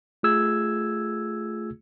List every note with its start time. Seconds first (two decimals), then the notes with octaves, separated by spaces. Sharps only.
0.23 A3 F4 G#4 E6 G#6